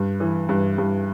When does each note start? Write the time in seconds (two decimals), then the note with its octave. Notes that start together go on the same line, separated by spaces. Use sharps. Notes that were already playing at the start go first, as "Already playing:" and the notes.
Already playing: G2
0.20 E3
0.49 G2
0.78 G2